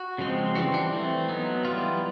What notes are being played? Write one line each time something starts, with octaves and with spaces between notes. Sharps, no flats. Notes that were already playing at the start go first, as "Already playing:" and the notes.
Already playing: F#4
C#3 F3 G#3 C4
E3 G3 C4 F#4
D4
E3 A3 C4
F#3 B3 D#4
E3 G3 B3 F4